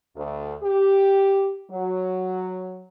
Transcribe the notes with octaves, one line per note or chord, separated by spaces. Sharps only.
D2
G4
F#3